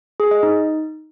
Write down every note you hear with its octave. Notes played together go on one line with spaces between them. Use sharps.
G#4
D#5
D#4